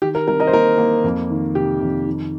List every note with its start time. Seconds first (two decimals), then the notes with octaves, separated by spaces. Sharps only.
0.02 D#3 G4
0.15 A#4
0.28 C2 A#4
0.40 A#4 D#5
0.47 C5
0.53 A#3 A#4
0.78 A#3
1.04 F2
1.30 D#3
1.55 C3 G4
1.81 F2
2.07 D#3